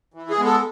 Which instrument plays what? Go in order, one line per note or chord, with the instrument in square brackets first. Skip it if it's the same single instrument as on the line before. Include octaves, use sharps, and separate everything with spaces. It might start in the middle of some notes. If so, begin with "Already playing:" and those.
[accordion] E3
G#4
G#3 B3
A4